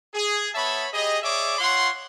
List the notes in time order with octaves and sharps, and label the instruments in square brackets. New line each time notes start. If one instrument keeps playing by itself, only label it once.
[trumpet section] G#4
B3 C#5 E5 A5 B5
G4 G#4 D#5
G#4 C#5 D5 E5 D6
F4 C#5 F#5 C6